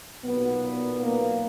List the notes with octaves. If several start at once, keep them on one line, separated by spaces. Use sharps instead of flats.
B1 A#2 F#3 B3
A#3